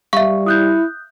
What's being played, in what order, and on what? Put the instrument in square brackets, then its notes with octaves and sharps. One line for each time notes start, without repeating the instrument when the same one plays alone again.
[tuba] G3 [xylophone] E5 F5 [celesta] C#6
[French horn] E4 [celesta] D#6 F#6 G6